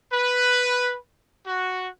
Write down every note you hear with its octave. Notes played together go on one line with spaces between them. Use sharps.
B4
F#4